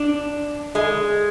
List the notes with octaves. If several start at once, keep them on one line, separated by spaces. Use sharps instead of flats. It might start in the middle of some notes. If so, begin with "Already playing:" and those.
Already playing: D4
G#3